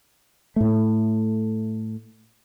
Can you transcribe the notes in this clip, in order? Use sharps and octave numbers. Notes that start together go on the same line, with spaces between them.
A2 A3